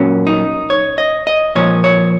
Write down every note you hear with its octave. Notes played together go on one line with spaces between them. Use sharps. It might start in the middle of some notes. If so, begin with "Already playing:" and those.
Already playing: A#2 F#3 C#4
D#4
C#5
D#5
D#5
A#2 F3 C#5
C#5